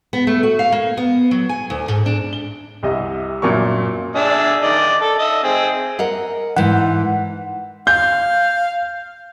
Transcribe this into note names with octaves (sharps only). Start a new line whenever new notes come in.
B3
A3
F#4
F5
A#3
B3
F#3
G#5
D2
G#2
D4
G7
C2 C3 D#5
G1 F#2 A#2 F#3 A#4 C#6
D4 G#4 E5
D#3 D5 D#5
A4
D#5 E5
C4 G#4
A#4 D#5 F#5
G#2 E3 F#5
F5 G6